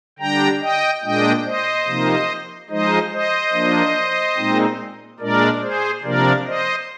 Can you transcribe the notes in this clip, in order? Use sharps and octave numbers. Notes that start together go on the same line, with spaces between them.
D3 G3 D4 G5 A#5
D#5 G5
A#2 G#3 D4 D#5 G5
C5 D#5
C3 F3 A#3 D#4
F3 G#3 D#4 C5 D#5
C5 D#5
F3 A#3 D4
A#2 G#3 C4 D#4
A#2 G#3 D4 A#4 D5
G#4 C5
C3 F3 A#3 D4 A#4 D5
C5 D#5